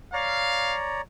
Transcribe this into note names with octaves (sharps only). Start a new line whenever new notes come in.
C#5 D5 F5 A#5